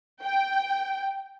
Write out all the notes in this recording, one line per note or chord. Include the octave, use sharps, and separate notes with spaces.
G5